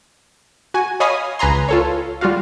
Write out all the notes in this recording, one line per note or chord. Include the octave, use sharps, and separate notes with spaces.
F#4 G#5
C#5 D#5 F5 G#5 B5 D#6
C#2 B4 G#5 A#5 C6
F4 A4 C#5
G3 F4 F#4 F5